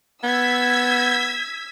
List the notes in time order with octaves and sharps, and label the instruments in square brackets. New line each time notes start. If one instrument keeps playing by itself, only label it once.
[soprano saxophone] B3 [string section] E6 G#6 B6